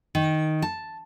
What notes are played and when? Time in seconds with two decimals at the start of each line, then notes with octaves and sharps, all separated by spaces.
0.15 D#3
0.62 A5